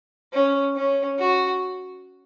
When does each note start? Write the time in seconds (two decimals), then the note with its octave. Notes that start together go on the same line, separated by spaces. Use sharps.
0.33 C#4
0.75 C#4
1.19 F#4